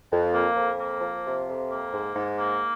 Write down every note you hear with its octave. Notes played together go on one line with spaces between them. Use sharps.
F2
A#3
F2
A#3
F3
C3
F2
A#3
G#2
G#2
A#3